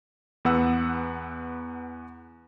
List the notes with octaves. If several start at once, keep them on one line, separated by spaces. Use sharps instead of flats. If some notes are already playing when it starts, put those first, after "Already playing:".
E2 B3 B4 F#5 E6